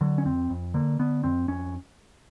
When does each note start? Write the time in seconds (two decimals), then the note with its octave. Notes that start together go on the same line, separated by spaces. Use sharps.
0.01 D3 F#3
0.18 C#4
0.25 F2 C4
0.50 F2
0.74 D3 A#3
0.99 D3 B3
1.24 F2 C4
1.48 F2 C#4